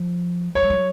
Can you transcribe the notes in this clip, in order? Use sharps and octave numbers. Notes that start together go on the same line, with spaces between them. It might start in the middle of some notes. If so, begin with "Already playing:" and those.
Already playing: F3
F#3 C#5
G3
F#3